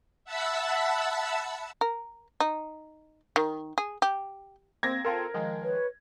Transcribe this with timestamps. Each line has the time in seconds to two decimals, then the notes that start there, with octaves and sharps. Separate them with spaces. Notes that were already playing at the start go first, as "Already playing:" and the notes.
0.25 E5 F#5 A5 B5 E6
1.81 A#4
2.40 D#4
3.36 D#3
3.78 G#4
4.02 G4
4.83 A#3 C4 G#6 A#6
5.05 C4 F4 A4 A#4
5.34 D#3 F3 G#3
5.61 B4 C#5